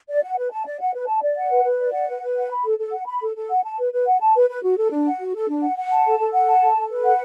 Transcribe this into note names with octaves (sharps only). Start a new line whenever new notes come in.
D5
F#5
B4
A5
D5
F#5
B4
A5
D5
F#5
B4
B4
D5
F#5
B4
B4
F#5
B5
A4
A4
F#5
B5
A4
A4
F#5
A5
B4
B4
F#5
A5
B4
B4
F#4
A4
D4
F#5
F#4
A4
D4
F#5
F#5
A5
A4
A4
F#5
A5
A4
A4
B4
F#5